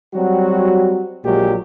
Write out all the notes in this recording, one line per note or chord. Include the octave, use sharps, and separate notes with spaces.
F#3 G3 C4 F#4
A#1 A#2 F#3 G#3 G4